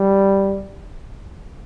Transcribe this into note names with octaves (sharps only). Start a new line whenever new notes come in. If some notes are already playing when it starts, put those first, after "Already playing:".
Already playing: G3